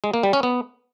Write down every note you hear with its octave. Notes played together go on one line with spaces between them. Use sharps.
G#3
A#3
G3
C#4
B3